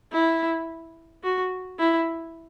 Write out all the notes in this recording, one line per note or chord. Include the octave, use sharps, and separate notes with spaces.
E4
F#4
E4